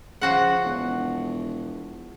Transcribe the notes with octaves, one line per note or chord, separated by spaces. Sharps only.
C#3 F3 F#4 F#5
E1